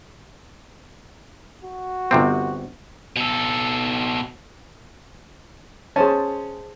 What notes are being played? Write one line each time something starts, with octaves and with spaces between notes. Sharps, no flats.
F#4
G1 C3 C4
B2 A4
C#4 G#4 C5 A5